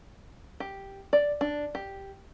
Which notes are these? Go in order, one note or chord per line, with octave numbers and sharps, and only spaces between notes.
G4
D5
D4
G4